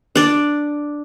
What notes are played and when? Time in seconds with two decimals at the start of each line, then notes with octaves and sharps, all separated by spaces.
0.15 D4 D5